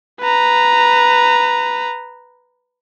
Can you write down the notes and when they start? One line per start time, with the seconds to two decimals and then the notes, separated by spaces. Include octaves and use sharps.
0.21 B4 A#5